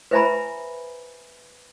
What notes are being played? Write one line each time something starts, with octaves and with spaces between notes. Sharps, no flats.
B4 C5 E5 G#5 A#5 B5